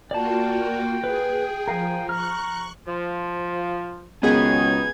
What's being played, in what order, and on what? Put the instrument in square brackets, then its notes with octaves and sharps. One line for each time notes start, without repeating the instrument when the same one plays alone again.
[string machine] A#3 F4 F#4 [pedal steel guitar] D5 A5 [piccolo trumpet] G5
[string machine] G#4 [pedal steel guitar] B4
[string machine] F3 [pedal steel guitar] A#4 F5 G#5
[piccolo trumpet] A#5 [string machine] C#6 F#6 [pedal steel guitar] F6
[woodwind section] F3
[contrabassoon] C#2 [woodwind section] D#3 F#3 D#4 [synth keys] B3 G#4 [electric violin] G#6